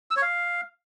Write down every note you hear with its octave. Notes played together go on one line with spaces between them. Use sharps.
E6
C#5
F5